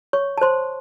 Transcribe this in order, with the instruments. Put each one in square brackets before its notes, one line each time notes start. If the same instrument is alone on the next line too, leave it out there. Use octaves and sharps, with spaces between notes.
[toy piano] C#5 C#6
A5
C5 C6